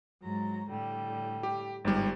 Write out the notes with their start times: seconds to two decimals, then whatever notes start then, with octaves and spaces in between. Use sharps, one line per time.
0.22 G#2 F#3 A#5
0.69 A2 D3 G3
1.43 G4
1.85 G1 G#2 G3